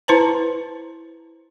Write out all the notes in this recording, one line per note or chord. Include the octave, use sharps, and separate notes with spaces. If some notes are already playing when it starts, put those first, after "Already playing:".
E4 B4 C5 A5 A#5